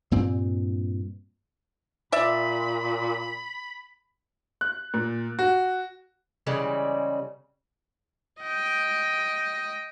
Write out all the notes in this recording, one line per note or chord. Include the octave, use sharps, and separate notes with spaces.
G2 A#2 C4
A#2 D5 E5 B5
F#6
A#2
F#4
C#3 E3 G3 G#3
D#5 G5